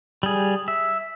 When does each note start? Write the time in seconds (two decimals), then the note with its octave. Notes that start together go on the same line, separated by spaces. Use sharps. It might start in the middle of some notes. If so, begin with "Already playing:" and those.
0.23 G3 G#4
0.68 E5